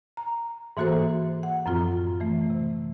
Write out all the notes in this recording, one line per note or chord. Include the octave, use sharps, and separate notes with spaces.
A#5
G#2 E3 A#3 F#4 A4 C5
F#5
F#2 A2 F3 C4 F4
E3 A3
C3